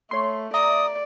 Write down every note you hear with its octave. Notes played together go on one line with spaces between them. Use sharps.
A3 C#5 C6
D5 E5 A#5 D#6